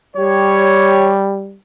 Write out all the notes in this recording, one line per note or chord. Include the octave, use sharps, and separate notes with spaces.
G3 G4 C#5